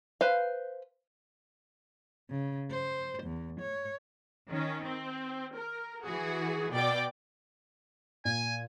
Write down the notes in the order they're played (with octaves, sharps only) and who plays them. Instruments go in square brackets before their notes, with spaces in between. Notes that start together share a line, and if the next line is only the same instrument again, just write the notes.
[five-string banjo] B4 C5 F5
[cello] C#3
C5
E2
C#5
[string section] D#3 C#4
C4
A#4
E3 F#4 G#4
B2 D5 G5 D6
[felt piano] A#2 [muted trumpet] G#5